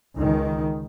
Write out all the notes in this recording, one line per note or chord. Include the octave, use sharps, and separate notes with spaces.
C#2 D#3